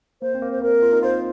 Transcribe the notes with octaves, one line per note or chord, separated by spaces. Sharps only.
A#3 C5
C4
A#3
C5
A#3 A#4
F4
D#4
F4 C5